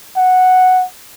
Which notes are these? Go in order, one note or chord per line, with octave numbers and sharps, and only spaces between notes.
F#5